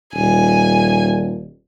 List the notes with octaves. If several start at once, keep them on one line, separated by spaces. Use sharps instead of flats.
D#1 G#5